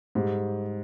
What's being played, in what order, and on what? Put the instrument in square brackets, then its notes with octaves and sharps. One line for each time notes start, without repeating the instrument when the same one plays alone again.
[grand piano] G#2 G3 G4